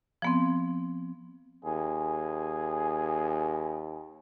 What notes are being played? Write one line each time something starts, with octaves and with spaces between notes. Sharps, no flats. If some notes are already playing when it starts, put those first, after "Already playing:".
F3 B3 C4
D#2 G#4